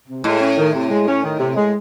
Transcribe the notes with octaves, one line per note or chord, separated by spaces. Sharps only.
C3
A2 G#3
C#4
D#3
C3
G#3
C#4
D#3
C3
G#3